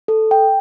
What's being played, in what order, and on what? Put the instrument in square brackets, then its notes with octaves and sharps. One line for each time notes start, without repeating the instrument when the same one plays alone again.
[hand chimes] A4
G5